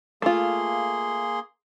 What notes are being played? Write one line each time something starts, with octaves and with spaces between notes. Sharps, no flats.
A3 A#3 F4 G#4 C6